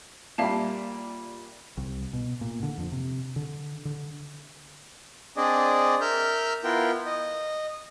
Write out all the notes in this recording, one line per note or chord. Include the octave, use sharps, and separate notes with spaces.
A#2 G3 E5 F5 A5
C2
B2
A#2
D3
F2
C3
D3
D3
C4 D4 G#4 D5 D#5
A#4 E5 F6 G6
B3 E4 F4 A#4 G5
D#5